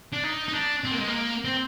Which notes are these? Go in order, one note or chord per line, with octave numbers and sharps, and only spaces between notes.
D4
D#4
D#4
D4
C4
A#3
G#3
A#3
C4